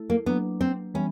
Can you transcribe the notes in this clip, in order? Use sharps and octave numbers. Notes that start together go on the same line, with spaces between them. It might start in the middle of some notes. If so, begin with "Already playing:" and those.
Already playing: A3 E4 A4
A#3
F#3 A#3 B3 D4
C4
E3 G3 B3 C#4